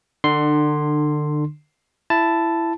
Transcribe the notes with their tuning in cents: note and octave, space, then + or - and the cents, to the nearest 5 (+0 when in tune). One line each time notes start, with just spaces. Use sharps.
D3 +30 D4 +40 C6 +0
E4 +15 A5 +0